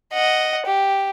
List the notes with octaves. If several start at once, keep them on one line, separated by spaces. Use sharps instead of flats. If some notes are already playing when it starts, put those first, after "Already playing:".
D#5 F#5
G4